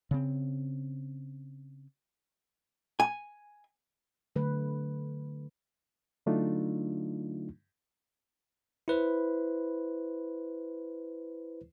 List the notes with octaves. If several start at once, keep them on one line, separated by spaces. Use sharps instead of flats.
C#3 C4
G#5
D3 F#3 A3 B4
D3 F#3 A3 D4 D#4 F4
E4 B4 C5